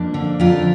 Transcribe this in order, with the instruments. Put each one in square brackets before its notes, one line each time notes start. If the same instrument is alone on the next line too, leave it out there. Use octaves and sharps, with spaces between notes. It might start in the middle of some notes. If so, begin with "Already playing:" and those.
Already playing: [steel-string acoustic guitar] F2 A#3 D4
D3
F2 F4 A#4